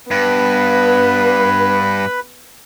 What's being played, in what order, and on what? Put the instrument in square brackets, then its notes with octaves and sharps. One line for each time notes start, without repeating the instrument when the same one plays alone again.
[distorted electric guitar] G2 [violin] B3 [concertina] B4 B5